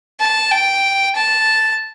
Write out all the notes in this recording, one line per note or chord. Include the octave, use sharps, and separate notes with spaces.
A5
G5
A5